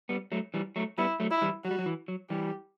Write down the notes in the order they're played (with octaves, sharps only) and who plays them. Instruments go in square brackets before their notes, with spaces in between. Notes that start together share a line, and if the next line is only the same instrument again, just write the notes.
[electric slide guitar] G3 B3
F#3 A3
E3 G3
F#3 A3
[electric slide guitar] G3 B3 [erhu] E4
[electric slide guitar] F#3 A3
[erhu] E4
[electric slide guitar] E3 G3
[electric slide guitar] F#3 [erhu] F#4
[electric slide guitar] G3
F#3
E3
F#3
[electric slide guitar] E3 G3 [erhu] G4